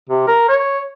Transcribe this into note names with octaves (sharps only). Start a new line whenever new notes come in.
C3
A#4
C#5